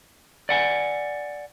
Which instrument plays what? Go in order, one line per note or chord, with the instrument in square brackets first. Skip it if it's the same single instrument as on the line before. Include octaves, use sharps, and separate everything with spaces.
[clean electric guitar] D5 F#5 G#5